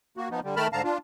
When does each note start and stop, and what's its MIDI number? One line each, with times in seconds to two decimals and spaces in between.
0.17 0.29 58
0.17 0.29 66
0.31 0.40 53
0.31 0.40 59
0.31 0.40 63
0.44 0.55 50
0.44 0.55 55
0.56 0.67 51
0.56 0.67 57
0.56 0.67 70
0.56 0.67 81
0.56 0.67 83
0.56 0.67 89
0.73 0.82 44
0.73 0.82 50
0.73 0.82 77
0.73 0.82 81
0.73 0.82 82
0.84 0.98 62
0.84 0.98 65